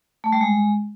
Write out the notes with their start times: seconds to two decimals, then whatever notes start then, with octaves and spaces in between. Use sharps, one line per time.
0.24 A3
0.32 G3
0.41 G#3